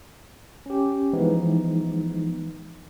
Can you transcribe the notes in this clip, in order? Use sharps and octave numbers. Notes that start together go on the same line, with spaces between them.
C#4 G4
E3 F3 G#3 B3 D#4